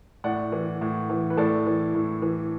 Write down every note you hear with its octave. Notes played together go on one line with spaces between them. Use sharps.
A2 D5 F#5
E3
A2
E3
B4
A2 A4 D5
E3
A2
E3